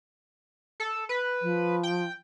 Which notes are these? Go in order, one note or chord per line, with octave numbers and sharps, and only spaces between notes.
A4
B4
F3
G5